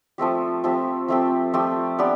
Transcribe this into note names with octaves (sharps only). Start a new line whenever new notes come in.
F3 A3 C4 G4
F3 A3 C4 G4
F3 A3 C4 G4
F3 A3 C4 G4
B3 D4 G4 D5